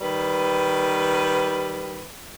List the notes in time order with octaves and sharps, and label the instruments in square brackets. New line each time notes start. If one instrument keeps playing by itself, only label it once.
[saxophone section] D#3 G3 B4